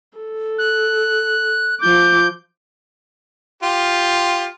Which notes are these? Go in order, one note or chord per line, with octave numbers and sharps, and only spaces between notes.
A4
F#6
F3 D6 G6
F4 G4